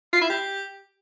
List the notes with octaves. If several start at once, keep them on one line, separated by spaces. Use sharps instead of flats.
F4
E4
G4